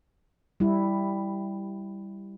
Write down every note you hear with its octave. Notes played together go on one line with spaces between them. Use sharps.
G3 E4